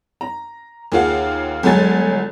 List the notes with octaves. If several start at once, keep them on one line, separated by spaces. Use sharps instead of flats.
A#5
D#2 A#3 F4 G#4 F5 F#5
G1 F#3 G#3 A4 G#5 A6